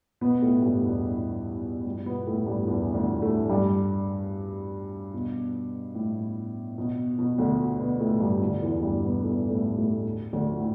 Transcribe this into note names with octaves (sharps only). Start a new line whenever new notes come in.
B2 B3
A2 A3
G2 G3
E2 E3
G2 G3
B2 B3
A2 A3
G2 G3
E2 E3
D2 D3
A2 A3
G2 G3
B2
A2
B2
B2
D2 D3
B2 B3
A2 A3
G2 G3
D2 D3
E2 E3
G2 G3
B2 B3
A2 A3
A2 A3
A2 A3
D2 D3
A2